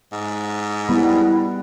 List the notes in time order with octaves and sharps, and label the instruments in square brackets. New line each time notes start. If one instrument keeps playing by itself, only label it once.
[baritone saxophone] G#2
[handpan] G3 B3 [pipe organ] E4